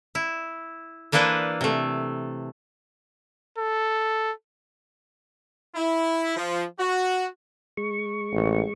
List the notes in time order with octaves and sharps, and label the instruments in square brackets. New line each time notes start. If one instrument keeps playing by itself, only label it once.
[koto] E4
E3 A#3 D4 E4 B4 C5
C3 A3
[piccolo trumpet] A4
[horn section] E4
F3
F#4
[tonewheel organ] G#3 C#6
[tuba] A1